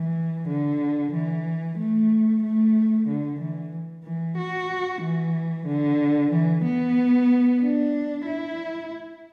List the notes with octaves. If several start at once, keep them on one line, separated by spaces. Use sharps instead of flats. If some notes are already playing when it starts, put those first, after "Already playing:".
Already playing: E3
D3
E3
A3
A3
D3
E3
E3
F#4
E3
D3
E3
B3
D4
E4